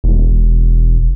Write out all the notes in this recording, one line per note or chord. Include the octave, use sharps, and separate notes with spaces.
E1